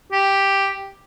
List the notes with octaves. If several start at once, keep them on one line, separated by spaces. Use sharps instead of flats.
G4